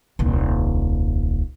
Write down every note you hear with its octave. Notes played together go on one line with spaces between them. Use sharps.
D#1 C2